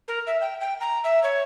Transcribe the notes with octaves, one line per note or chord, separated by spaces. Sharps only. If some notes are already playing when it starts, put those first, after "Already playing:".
A#4
E5
G5
G5
A#5
E5
C#5